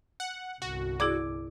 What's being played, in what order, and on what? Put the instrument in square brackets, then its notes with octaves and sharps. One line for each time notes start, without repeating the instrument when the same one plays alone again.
[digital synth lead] F#5
[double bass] G1 C2 [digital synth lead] F#4
[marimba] E4 G#4 D5 [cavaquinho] D6